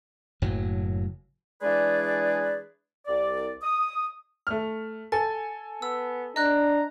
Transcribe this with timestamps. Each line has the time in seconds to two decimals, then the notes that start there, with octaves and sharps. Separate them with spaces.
0.42 F#1 A2 F#3
1.62 E3 G#3 D4 G#4 B4 D5
3.07 C2 D5
3.63 D#6
4.47 A3 F6
5.12 A4 G#5 A6
5.82 B3 E6
6.36 D4 D#5 A#5 F#6